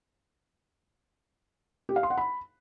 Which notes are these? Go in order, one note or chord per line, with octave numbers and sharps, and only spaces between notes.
G4
F5
C6
F#5
B5